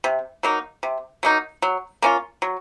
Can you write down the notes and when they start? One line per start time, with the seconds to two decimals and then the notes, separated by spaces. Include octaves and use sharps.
0.04 C3
0.43 F#3 A#3 D#4
0.83 C3
1.23 F#3 A#3 D#4
1.62 F#3
2.02 A#3 C#4 F4
2.42 F#3